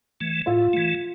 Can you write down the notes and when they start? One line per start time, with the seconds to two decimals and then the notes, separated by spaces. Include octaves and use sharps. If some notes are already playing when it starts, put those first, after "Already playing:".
0.20 E3 A3
0.46 A2 F4
0.73 E3 A3